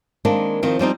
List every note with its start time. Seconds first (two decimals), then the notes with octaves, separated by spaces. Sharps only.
0.25 D#3 G#3 A#3 C4 D4
0.63 D#3 F3 C4
0.79 F3 G3 C4 D#4